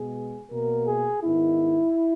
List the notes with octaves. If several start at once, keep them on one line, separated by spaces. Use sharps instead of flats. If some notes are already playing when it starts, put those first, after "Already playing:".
Already playing: B2 G#3 B3 G#4
B2 A#3 A#4
G#4
G#2 D#3 G#3 B3 E4